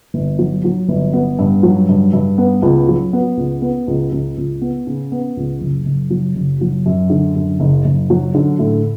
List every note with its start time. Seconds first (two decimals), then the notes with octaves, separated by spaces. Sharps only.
0.14 G1
0.39 F#3
0.65 F#3
0.88 G1
1.13 B3
1.39 G2
1.63 F#3
1.89 G2
2.13 G2
2.38 B3
2.62 C#2
2.88 F#3
3.13 B3
3.37 C#2
3.62 B3
3.87 C#2
4.12 C#2
4.37 C#2
4.62 B3
4.87 C#3
5.12 B3
5.37 C#2
5.61 F#1
5.86 F#1
6.10 F#3
6.35 F#1
6.61 F#3
6.86 F#2
7.10 D3
7.36 F#2
7.60 F#1
7.85 F#1
8.10 F#3
8.35 D3
8.59 A2